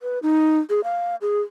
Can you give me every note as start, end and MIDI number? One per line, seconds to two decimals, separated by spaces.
0.01 0.19 71
0.23 0.59 63
0.70 0.81 68
0.84 1.16 77
1.22 1.40 68